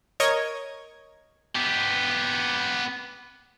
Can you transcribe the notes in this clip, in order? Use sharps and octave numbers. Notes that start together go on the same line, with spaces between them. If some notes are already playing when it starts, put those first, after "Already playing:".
A#4 C#5 D#5 C#6 G#6 A#6
B3 G4